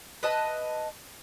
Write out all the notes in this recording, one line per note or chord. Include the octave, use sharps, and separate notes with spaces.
B4 D#5 E5 A5